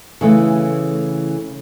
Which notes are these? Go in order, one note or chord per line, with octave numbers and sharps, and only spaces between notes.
C#3 E3 A3